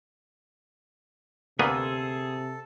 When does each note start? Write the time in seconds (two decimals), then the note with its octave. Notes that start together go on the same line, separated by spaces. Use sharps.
1.59 D2 C3 A#3 B3 G#4 A4 C6 E6